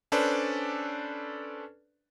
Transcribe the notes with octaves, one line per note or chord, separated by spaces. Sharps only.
C#4 D4 A4 B4 C5 D5